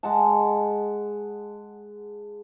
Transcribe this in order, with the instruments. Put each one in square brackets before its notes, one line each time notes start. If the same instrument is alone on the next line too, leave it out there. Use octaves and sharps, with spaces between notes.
[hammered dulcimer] G#3 F#5 A5